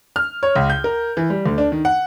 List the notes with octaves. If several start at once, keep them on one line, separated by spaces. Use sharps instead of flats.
F6
C#5
C#2
G6
A#4
E3
G3
D2
D4
D#3
F#5